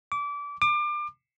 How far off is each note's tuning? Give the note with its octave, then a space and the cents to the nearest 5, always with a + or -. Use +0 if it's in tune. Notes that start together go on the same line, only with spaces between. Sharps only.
D6 -25
D6 +30